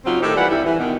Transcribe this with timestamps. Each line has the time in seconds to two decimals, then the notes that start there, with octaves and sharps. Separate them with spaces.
0.06 C#3 F#3 C4 C#4 D#4 F4
0.22 A2 D#3 D#4 G4 A4
0.36 A#2 E3 G3 B4 D5 F#5
0.50 G2 C3 G3 E4
0.64 E3
0.79 B2 D#3